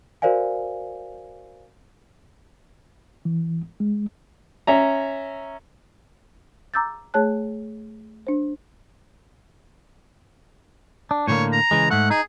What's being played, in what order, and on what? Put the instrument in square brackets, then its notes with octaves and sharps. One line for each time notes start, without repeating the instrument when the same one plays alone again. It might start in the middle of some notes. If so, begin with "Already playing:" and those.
[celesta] F#4 A#4 C5 D5 F5 G#5
[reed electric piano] E3
G#3
[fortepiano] C#4 E5 A#5
[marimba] A#5 D6 E6 G6 A6
A3 G#4 C#5 A5 F#6
D4 C5
[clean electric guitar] D4
[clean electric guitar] A2 D3 A#3 [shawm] C#5
[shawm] A#5
[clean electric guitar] C#3 E3 G#3
[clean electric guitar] G#2 A3 [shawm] F#5
[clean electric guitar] D#4 [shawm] G#4